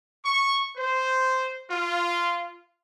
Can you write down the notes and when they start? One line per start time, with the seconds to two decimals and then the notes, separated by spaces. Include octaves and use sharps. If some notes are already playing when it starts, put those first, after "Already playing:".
0.24 C#6
0.76 C5
1.70 F4